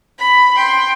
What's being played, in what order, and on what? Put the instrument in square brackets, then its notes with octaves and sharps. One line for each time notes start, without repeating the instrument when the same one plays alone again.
[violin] B5
G5 C6